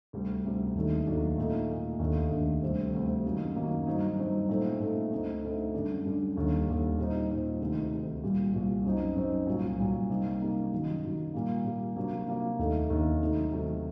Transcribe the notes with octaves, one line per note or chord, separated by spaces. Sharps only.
D2 C3 G3
D2 C3 G3
D#2 D#3 F#3 A3 D4
D#2 D#3 F#3 A3 D4
A#2 A3 D#4
A#2 A3 D#4
D#2 D3 A3 D4
D#2 D3 A3 D4
D2 C3 G3 C4
D2 C3 G3 C4
F#2 D#3 F#3 A#3
F#2 D#3 F#3 A#3
G2 F#3 C4 D#4
G2 F#3 C4 D#4
A#2 A3 C4 D#4
A#2 A3 C4 D#4
D2 D3 A3 C4 D#4
D2 D3 A3 C4 D#4
F#2 D3 G3 D4
F#2 D3 G3 D4
D#2 D3 G3
D#2 D3 G3
A#2 G3 C4 D#4
A#2 G3 C4 D#4
D2 C3 D#3
D2 C3 D#3
C2 A#2 G3
C2 A#2 G3
F#2 F#3 C4 D#4
F#2 F#3 C4 D#4
C2 A#2 F#3
C2 A#2 F#3
C3 G3 A#3 D#4
C3 G3 A#3 D#4
F#2 D#3 F#3
F#2 D#3 F#3
A#2 G3 A#3
A#2 G3 A#3
C3 F#3 A#3 D4
C3 F#3 A#3 D4
D#2 D3 A3 D#4
D#2 D3 A3 D#4
C3 D#3 F#3 A3 D#4
C3 D#3 F#3 A3 D#4